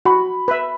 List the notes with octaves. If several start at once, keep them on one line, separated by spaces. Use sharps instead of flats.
F#4 B5
B4 E5